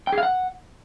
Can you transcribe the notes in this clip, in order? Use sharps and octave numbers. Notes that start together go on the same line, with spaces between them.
G5
G#4
F5
F#5